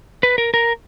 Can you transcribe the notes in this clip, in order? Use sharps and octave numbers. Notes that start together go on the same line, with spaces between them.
B4
A#4
A#4